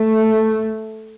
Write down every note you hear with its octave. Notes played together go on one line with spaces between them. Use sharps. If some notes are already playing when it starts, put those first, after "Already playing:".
Already playing: A3